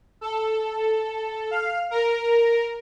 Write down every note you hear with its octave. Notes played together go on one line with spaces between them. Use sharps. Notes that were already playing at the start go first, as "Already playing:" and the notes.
A4
F5
A#4